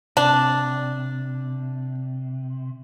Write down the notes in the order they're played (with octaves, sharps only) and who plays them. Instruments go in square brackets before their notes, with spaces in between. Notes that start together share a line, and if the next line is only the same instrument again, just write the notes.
[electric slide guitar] C3 [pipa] D4